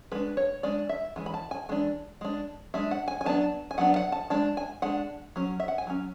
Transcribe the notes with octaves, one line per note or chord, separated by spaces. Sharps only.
G#3 D4 B4
C#5
G#3 D4 D5
E5
E3 G#3
B5
A5
G#5
E3 G#3 D4
G#3 D4
G#3 D4 E5
F#5
G#5
G#5
F#3 B3 D4 A5
G#5
F#3 B3 D4 F#5
F#5
A5
G#3 D4 A5
G#5
G#3 D4 F#5
F#3 C#4
E5
F#5
G#5
F#3 C#4